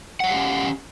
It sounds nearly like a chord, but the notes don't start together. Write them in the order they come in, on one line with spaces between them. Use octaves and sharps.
F#5 C#5 F5 G4 C#4